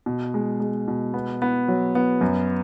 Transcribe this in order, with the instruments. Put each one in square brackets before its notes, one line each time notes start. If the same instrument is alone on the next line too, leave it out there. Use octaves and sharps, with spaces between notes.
[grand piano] B2
G#3
G#3
B2
B3
B3
F#3
B3
F#2